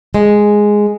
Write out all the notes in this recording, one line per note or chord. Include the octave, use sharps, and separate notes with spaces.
G#3